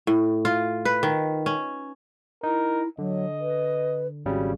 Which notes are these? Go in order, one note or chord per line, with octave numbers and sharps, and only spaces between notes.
A2
F4
B4
D#3
C#4
D#4 E4 A#4
D3 F#3 D#5
B4
G#1 C#3 G3 F#4